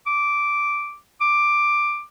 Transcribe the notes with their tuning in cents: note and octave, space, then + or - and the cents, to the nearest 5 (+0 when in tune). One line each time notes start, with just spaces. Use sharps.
D6 -5
D6 +10